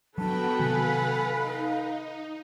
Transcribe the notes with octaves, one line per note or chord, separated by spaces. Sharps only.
F#3 B3 D4 F#4 A4 B4 G5 A5
C3 D#3 F#3 F5 F#5 G#5
D#4 F5